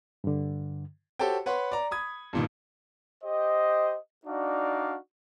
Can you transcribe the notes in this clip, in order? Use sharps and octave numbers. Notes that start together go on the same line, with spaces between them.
G2 D3
F#4 G4 A4 C5 C#5 G5
B4 C#5 F#5 B5 C6
D5 A#5
B5 D#6 G#6
G2 A#2 D#3
G4 C5 D#5
D4 D#4 F#4 D5 F5